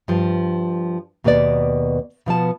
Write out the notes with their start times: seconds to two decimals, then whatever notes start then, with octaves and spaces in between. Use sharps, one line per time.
0.08 G2 F3
1.24 D#2 B2 A#3 B3 D5
2.26 B2 F3 B3 A5